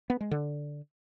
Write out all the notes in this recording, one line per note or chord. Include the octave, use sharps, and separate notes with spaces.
B3
G#3
D3